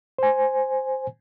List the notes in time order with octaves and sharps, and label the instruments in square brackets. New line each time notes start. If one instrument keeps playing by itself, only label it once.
[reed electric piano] C5 G#5